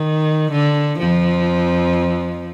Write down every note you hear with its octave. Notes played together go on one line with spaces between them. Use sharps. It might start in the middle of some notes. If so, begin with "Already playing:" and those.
Already playing: D#3
D3
F2 F3